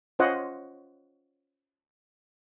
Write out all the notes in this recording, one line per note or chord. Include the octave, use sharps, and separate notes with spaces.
C#4 F4 C5 C#5 D#5 F#5